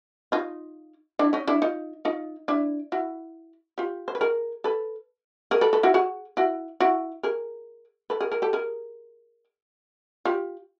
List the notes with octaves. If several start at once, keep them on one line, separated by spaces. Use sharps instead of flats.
D#4 F4
D4 E4
C#4 D#4
D4 E4
D#4 F4
D#4 F4
D4 E4
E4 F#4
F4 G4
C5
B4
G#4 A#4
A4 B4
G#4 A#4
A4 B4
A4 B4
E4 F#4
F#4 G#4
E4 F#4
E4 F#4
G#4 A#4
A4 B4
G#4 A#4
G#4 A#4
G4 A4
G#4 A#4
F4 G4